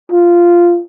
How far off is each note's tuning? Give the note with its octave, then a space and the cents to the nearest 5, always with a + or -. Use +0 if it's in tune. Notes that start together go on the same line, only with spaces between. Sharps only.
F4 -10